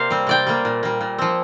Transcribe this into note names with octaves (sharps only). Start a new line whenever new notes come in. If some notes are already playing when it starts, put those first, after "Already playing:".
Already playing: C3 A#3 A#4 C5 D5 F5
G3 C4
C3 D5 G5
G3 A#3
A#2
G3 A#3
A#2
F3 C4